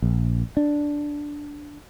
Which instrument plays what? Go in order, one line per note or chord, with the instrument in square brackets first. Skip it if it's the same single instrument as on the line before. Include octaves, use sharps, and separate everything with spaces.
[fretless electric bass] A#1
D4